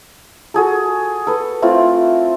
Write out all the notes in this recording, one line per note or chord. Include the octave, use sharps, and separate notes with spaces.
F#4 G#4 A4
A4 B4
A3 C4 E4 F4